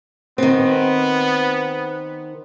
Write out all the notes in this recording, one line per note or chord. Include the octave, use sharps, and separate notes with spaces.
D#3 B3 C4